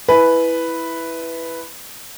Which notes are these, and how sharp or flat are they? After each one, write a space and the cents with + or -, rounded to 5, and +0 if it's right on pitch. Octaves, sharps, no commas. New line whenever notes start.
E4 +0 B4 +0 G#5 +25